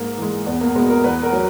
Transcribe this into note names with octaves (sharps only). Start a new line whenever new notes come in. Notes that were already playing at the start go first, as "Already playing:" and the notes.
Already playing: G#2 A#3
E3 G#3
E2 B3
A#3
B2 G#3 B3
A#4
E2 B4
A#4
F#3